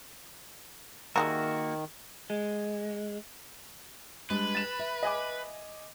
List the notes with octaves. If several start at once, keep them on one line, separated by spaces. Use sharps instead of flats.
D#3 G3 G#3 A#3 F#4 A#4 E5
G#3
G3 G#3 D4 B4
A6 E7
E5
D#5 G#5 D6